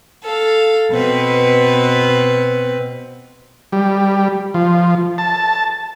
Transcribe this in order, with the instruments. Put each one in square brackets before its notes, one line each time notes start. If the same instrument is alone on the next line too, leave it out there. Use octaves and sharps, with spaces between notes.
[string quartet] A4 F5
B2 C4 B4
[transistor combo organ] G3
F3
A5